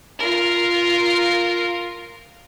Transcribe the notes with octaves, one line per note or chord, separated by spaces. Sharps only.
F4 A#4